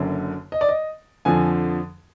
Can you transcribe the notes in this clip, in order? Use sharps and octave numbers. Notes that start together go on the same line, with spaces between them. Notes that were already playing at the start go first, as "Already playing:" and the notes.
Already playing: F#1 F#2 D3
D#5
D5
D#5
F2 D3 F3 G#5